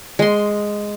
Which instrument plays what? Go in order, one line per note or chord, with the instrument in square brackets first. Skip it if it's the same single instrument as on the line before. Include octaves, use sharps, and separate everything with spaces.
[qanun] G#3 C6